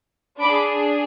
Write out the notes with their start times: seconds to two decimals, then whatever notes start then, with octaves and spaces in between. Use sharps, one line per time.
0.41 D4 G#4 B5 D6